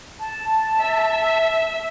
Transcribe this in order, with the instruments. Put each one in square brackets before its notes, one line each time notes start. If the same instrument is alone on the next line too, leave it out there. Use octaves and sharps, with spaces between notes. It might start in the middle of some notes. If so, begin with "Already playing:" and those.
[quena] A5
[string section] E5